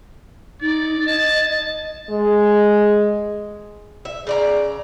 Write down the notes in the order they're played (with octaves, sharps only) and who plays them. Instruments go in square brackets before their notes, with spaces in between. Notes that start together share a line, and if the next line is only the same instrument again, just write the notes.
[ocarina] D#4 [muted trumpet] D5
[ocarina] D#5 [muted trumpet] A5
[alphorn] G#3
[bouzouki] E5
C#3 D5 A#5